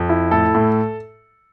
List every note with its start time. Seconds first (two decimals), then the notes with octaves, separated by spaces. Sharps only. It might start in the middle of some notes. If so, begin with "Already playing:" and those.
Already playing: F2
0.09 E4
0.31 A2 A4
0.54 A2